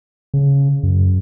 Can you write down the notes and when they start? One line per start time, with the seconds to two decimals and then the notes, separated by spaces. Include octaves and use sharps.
0.34 C#3
0.83 F#2